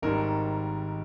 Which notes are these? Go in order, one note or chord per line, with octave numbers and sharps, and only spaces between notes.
G#1 G#2 D#3 G3 A#4